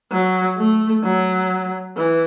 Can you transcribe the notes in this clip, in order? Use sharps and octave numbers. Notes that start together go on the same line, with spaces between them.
F#3
A3
F#3
E3